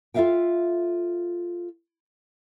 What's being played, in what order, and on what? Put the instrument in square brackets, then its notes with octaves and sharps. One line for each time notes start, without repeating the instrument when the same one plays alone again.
[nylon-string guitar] F4 A4 B4 E5 F5 G5